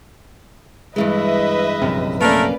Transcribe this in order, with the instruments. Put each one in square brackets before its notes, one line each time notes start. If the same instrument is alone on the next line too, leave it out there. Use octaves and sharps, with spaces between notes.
[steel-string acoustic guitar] G2 E3 G#3 [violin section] B4 D#5 E5
[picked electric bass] A#1 F#2 C3
[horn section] A3 A#4 [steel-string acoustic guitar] A#3 C#4 [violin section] B4 D5